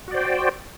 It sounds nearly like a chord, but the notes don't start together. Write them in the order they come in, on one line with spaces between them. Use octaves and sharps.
F#4 D5 C5 G5